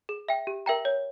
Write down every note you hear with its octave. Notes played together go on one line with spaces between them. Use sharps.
G#4
E5 G5
G4
A#4 E5 G5 A#5
C#5